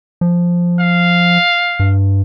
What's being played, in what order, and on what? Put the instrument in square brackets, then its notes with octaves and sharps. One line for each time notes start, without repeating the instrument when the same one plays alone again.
[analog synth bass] F3
[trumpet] F5
[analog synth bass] G2